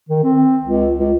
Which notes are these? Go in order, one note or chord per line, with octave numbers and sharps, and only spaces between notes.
D#3
C4
C#2
C#2